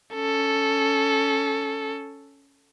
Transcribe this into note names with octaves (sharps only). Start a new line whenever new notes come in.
C#4 A4